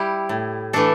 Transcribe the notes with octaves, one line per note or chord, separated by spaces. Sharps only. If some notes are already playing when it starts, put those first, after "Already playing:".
Already playing: G3 E4 G4
A2
E3 A3 D4 A4